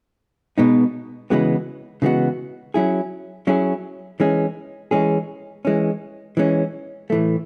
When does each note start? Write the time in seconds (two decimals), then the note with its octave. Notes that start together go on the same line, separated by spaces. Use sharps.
0.58 B2 G#3 B3 D#4
1.30 C#3 E3 G#3 B3 F#4
2.02 C#3 E3 G#3 B3 F#4
2.74 F#3 C#4 E4 G#4
3.47 F#3 C#4 E4 G#4
4.20 E3 G#3 C#4 G#4
4.91 E3 G#3 C#4 G#4
5.65 E3 G#3 C#4
6.37 E3 G#3 C#4
7.10 A2 E3 A3